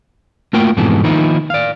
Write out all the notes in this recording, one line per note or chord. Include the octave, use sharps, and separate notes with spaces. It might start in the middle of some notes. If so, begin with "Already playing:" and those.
A3 A#3 F4 F#4 A#4 G5
F2 G#2 B2 E3 G#4 A4
D#3 F3 A#3 D#4 E4
D5 F5